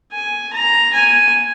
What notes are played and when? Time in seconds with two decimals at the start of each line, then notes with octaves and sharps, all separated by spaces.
0.12 G#5
0.53 A#5
0.93 G#5